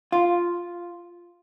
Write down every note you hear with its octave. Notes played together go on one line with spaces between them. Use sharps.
F4